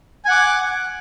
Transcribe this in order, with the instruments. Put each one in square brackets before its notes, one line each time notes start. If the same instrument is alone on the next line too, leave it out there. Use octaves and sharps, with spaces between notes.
[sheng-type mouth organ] G#5
F#5
D6